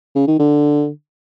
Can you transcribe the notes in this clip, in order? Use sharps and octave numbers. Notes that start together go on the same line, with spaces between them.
C#3
D#3
D3